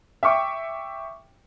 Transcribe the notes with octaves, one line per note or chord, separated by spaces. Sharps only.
E5 G5 C#6 D6